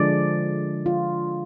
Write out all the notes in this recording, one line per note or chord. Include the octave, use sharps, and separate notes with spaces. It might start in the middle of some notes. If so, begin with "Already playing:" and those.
Already playing: D3 F3 G#3 D4 D5
F4